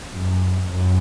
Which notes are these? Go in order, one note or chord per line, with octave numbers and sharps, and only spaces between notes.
F#2
F#2